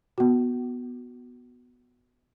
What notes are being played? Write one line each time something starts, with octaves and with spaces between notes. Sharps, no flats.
B3 F#4